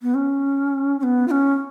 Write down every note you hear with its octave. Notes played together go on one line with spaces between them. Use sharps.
B3
C#4
C#4
B3
F4
C#4